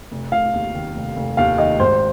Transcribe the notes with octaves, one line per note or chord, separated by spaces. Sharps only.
F1
F1 F5
D#2
D#3
F1
F1
D#2 F5
D#3 D#5
G#1 C5